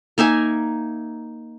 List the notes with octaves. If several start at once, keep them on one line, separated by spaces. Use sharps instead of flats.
A#3 D#4 E5 G#5